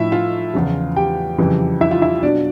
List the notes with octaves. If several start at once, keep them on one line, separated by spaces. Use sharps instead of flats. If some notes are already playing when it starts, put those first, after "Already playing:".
Already playing: A2 F3 D#4 E4 E5
F4 F5
E2 C#3 F3
G4 G5
F2 C#3 E3 G3
E4 E5
F4 F5
E4 E5
B2 F#3 D4 D5